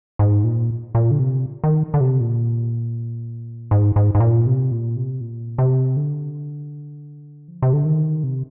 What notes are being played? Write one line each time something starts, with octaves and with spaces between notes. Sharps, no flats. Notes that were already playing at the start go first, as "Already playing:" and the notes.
G#2
A#2
A#2
D3
C3
D#3
D3
C3
A#2
G#2
G#2
G#2
A#2
C3
A#2
C3
A#2
C3
D3
F3
C3
D3
D#3
C3